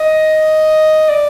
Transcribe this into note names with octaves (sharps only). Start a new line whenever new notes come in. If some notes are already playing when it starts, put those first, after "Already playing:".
Already playing: D#5
D5